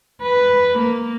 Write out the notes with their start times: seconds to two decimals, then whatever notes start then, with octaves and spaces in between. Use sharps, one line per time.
0.23 B4
0.80 A#3